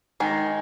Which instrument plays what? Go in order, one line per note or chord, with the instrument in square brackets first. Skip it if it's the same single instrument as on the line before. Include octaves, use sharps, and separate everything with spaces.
[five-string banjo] D#3 G#3